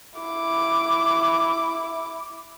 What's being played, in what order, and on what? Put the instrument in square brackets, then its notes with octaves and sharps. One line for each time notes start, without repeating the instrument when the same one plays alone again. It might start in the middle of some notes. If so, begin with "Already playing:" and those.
[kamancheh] E4 D6